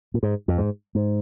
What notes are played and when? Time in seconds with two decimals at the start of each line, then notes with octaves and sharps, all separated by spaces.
0.14 A#2
0.23 G#2
0.48 F2
0.58 G#2
0.95 G#2